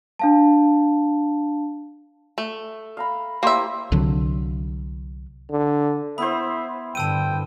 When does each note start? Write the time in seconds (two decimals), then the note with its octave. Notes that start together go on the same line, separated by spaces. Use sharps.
0.19 D4 F5 A5
2.38 A3
2.97 F5 A#5 B5
3.43 A#3 E4 G4 C5 E5
3.92 C2 D3 F#3
5.51 D3
6.18 B3 E4 C5 E5 B5
6.95 G2 D3 G5 A5 E6 D#7